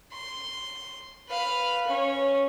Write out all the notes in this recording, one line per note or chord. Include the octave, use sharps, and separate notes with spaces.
C6
B4 F5
C#4 C#5